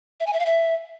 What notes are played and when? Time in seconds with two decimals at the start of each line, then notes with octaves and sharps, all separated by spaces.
0.20 E5
0.27 G#5
0.33 E5
0.39 F5
0.46 E5